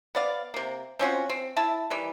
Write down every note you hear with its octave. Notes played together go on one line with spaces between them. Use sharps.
B3 D5 F5
C3 A#3
C4 C#4 F4 F#4
C4
E4 E5 A5
D#3 E3 G3